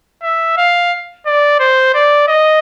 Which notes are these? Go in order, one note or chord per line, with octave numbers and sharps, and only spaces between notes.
E5
F5
D5
C5
D5
D#5